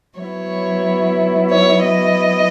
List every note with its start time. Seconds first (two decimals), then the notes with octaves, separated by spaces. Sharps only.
0.19 F#3 B3 E4 C#5
1.50 C#5
1.83 D#5